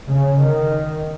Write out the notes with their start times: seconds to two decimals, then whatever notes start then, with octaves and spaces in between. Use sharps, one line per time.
0.08 C#3
0.39 D#3